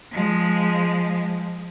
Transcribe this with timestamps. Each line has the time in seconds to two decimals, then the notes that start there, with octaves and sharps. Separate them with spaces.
0.12 F3 G#3